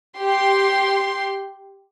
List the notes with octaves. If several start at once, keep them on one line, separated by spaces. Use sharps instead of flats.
G4 C6